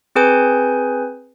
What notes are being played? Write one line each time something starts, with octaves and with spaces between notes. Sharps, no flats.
C4 G#4 B4 G#5 G6